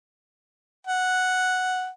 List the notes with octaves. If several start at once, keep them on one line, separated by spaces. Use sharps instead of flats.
F#5